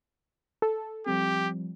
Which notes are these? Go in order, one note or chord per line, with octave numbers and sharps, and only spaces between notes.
A4
F3 G3 C4 G4